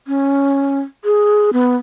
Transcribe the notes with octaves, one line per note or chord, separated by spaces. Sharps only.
C#4
G#4
B3